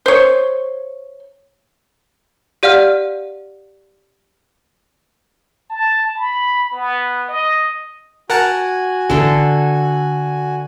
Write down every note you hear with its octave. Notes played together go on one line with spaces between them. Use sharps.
C5 C#5
G4 D5 F5 F#5 F6
A5
B5
B3
D#5
F#4 A#4 F#5 G#5 A5
A1 D3 A4